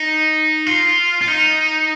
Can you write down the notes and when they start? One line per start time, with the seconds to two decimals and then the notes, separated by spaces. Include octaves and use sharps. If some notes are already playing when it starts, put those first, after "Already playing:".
Already playing: D#4
0.66 F4
1.21 F4
1.28 D#4